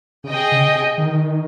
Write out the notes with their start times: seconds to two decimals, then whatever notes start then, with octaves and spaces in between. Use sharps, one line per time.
0.24 C#3
0.29 C3 G#4 D#5 G5
0.52 C#3
0.75 C3
0.98 D#3